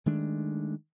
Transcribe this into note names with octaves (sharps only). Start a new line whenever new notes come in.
D#3 G#3 A3 D4